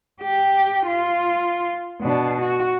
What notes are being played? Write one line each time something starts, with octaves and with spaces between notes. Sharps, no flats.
G4
F4
B2 D4
F#4